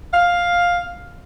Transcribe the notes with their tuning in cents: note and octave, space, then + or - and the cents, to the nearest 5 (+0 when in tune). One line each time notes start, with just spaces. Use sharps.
F5 +5